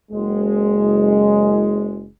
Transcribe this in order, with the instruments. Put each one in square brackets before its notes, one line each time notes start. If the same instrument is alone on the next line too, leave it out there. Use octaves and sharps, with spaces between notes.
[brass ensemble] F#1 G#3